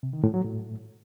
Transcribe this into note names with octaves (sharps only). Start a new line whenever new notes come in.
C3
D#3
A2
F#3
A2